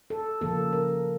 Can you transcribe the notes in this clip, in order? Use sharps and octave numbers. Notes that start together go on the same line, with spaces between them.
A4
C#3 F3 A#3 A4
A#4